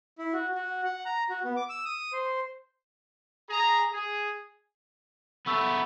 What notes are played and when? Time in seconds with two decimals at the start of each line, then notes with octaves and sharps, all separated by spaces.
0.19 E4
0.33 F#4
0.55 F#4
0.84 F#5
1.05 A#5
1.29 F#4
1.44 B3
1.56 D6
1.69 E6
1.85 D#6
2.13 C5
3.50 G#4 A#5
3.92 G#4
5.47 A3 B3 C#6 E6